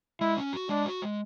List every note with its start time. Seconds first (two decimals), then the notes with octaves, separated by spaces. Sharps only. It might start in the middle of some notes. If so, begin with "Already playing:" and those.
0.20 G#3 E4
0.37 C#4
0.53 F#4
0.69 G#3 D4
0.85 F#4
1.02 G#3